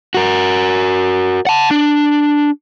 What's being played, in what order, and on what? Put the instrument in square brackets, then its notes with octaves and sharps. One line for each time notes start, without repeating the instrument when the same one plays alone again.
[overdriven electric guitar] F#4 A#4
F#5 A5
D4